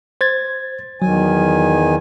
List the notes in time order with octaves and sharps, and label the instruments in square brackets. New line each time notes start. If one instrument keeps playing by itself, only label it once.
[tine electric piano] C5 G#6 A6
[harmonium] E2 D#3 G#5 [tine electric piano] F#3